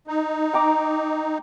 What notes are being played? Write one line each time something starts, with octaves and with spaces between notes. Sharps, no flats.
D#4
G5 A#5 D6